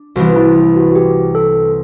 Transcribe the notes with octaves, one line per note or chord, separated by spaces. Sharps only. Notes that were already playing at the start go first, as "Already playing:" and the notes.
Already playing: D4
C2 C3 E3 B3 F#4
E4
E4
F#4
F#4
G4
A4